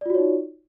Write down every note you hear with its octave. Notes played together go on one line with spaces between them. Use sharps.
D#4 F4 F#4 C#5 D5